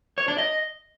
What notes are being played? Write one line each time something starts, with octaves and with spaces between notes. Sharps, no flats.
C#5
D4
D#5